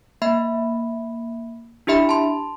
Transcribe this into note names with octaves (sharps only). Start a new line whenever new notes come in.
A#3 E5 B5
D4 E4 G4 E5 B5
A5 C6